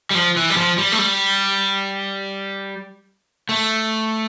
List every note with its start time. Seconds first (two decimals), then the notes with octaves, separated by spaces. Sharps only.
0.11 G3
0.15 F3
0.36 E3
0.50 G3
0.57 F3
0.78 G3
0.92 A3
0.99 G3
3.49 A3